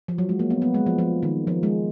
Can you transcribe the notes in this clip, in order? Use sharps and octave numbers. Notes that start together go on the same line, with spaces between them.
F3
F#3
G#3
A#3
B3
B3
G#3
F3
F3
D#3
F3
G#3